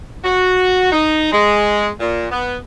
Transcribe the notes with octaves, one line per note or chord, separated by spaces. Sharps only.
F#4
D#4
G#3
A#2
B3